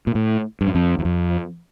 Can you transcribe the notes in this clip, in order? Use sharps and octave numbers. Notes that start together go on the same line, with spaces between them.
A#2
A2
G2
F#2
F2
E2
F2